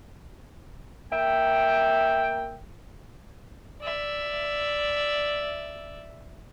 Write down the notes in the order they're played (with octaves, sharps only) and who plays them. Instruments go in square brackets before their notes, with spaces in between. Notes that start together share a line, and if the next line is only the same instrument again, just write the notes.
[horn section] A#3 E5 G5
[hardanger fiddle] D5 E5